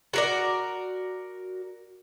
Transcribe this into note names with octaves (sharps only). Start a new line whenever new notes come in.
F#4 A#4 D5